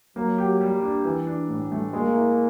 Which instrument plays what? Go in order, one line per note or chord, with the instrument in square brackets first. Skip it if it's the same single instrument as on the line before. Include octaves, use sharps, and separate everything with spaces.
[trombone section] F#3 [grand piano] A#3
[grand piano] G4
G3
D4
E3
D4
A2
A3
[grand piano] G#3 [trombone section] A#3
[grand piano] E4